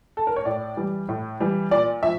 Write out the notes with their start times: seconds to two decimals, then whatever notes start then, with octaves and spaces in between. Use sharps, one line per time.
0.17 A4
0.27 A#4
0.36 C#5
0.45 A2 D5
0.77 E3 G3
1.09 A2
1.40 E3 G3
1.71 A#2 D5
2.03 F3 E5